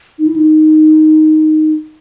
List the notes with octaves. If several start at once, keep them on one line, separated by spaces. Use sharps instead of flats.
D#4
E4
D#4